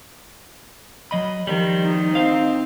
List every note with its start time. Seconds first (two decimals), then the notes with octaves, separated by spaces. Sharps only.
1.11 F#3 D#5 B5
1.47 D#3 F3 G3
1.85 D#4
2.15 C4 C5 F5